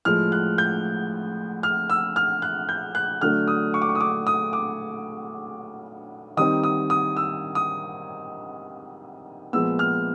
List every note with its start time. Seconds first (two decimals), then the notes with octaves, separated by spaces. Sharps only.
0.05 A2 F3 G#3 F6
0.32 F#6
0.58 G6
1.63 F6
1.90 E6
2.16 F6
2.42 F#6
2.69 G6
2.95 F#6
3.21 D3 F#3 A3 D4 F6
3.48 D#6
3.74 C#6
3.82 D6
3.89 C#6
3.95 D#6
4.00 D6
4.27 D#6
4.53 D6
6.37 D#3 G3 C4 D#4 D#6
6.64 D#6
6.90 D#6
7.16 E6
7.55 D#6
9.53 A#2 F3 G#3 B3 E6
9.79 F6